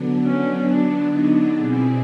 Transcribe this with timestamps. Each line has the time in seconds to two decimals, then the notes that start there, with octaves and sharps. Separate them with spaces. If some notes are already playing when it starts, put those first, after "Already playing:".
Already playing: D3 F#3 B3 D4
0.25 C#4
0.69 D4
1.14 D#4
1.57 B2 G3 C4 E4 G#4